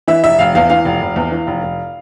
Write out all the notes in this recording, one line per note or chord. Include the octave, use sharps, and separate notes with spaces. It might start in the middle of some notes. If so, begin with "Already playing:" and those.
E3 E5
F1 E5
F1 F5
E2 F5
E3 F5
F1
F1
E2
E3
F1
F1